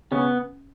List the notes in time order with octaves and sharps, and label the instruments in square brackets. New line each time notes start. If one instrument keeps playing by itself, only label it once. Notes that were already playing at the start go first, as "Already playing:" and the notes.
[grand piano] C#3 C#4 [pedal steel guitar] B3